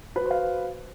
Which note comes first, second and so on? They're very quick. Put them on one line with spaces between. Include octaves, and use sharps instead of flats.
B4 F#4 C5 F5